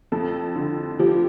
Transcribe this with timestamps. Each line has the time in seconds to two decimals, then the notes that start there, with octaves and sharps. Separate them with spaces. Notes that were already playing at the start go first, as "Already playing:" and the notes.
0.12 F2 A4
0.56 D3
0.99 F3 G4